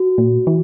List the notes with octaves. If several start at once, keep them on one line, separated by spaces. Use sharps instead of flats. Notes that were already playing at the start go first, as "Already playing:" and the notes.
Already playing: F#4
A#2
E3